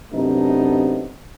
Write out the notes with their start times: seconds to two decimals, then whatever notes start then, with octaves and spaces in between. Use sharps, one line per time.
0.12 F#2 C3 A3 B3 D4 D#4